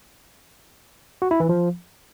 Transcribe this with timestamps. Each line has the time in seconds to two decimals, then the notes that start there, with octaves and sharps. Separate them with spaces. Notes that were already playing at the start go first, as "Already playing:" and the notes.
1.22 F#4
1.31 E4
1.40 E3
1.49 F3